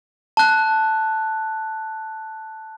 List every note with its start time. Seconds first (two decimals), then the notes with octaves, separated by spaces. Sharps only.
0.37 A5 F#6